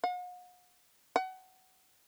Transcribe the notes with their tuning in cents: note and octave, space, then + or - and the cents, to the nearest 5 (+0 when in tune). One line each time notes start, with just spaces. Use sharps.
F#5 -45
F#5 +25